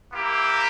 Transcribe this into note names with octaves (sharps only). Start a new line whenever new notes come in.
A#3 E4 G4